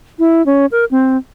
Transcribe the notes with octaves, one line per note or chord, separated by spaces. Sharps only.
E4
C#4
A#4
C4